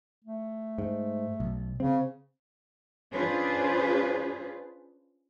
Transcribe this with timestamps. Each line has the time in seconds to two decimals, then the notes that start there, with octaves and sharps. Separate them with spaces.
0.25 A3
0.78 G#2
1.40 B1
1.80 C#3 C4
3.12 C#4 D4 F4 G#4 B4 C5